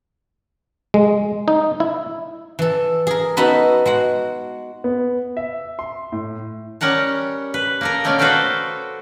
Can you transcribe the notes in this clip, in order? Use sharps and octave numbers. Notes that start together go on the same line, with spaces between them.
G#3
D#4
E4
E3 A4
G#4 A#4
B3 D#4 F#4 A4 B4
G#3 F#4 F#5
B3
E5
C6
A2
G3 C#4 A#4 F#5 A5
B4
A#3 A4 A#4
B2 A3 A#3 C#4 A#4 D5
F#4 A4 B4 C5 F5 G5